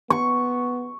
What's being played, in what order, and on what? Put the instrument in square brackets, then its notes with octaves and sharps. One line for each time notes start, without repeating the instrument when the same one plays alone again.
[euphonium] B3 [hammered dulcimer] C#6